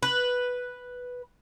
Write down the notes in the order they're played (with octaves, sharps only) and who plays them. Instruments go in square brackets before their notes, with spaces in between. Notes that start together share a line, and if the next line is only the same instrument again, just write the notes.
[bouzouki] B4